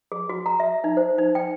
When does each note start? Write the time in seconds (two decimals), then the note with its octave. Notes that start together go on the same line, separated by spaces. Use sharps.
0.12 G#4
0.29 F#4
0.46 A#5
0.60 E5
0.84 D#4
0.97 C5
1.18 D#4
1.35 G5